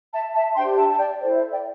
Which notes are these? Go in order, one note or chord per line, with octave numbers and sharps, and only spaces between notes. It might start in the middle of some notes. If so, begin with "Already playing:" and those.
E5 A5
E5 A5
D4 G4 C5 G5 C6
E5 A5
A5
D5 G5
E4 A4 C5 D5
E5
D5 G5